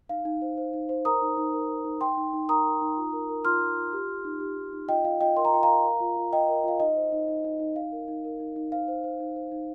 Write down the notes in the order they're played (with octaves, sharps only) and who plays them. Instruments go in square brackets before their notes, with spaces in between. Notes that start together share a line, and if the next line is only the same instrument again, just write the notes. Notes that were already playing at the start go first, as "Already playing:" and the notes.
[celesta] D#4 F5
D#4
C5
C5
D#4
C5
A#4 A#5 D#6
D#4
D#4
A#4
A#4
D#4
D#4 G5 C6
D#4
D#4
A#4 A#5 D#6
A#4
D#4
F4
A#4
A#4
F4 C6 F6
F4
F4
G4
G4
D#4
G4
D#4
D#4
F4 D#5 G5
F4 F5
F4 D#5 G5
A#4 C6
A#5
F4 G5
F5 A#5
A#4
A#4
F4
F4
F4 D#5 G5
A#4
F4 F5
D#4 D#5
C5
D#4
D#4
D#4
D#4
D#4 F5
A#4
D#4
A#4
D#4
D#4
C5 F5
C5
C5
D#4
C5
D#4